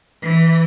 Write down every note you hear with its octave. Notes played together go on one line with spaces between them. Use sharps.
E3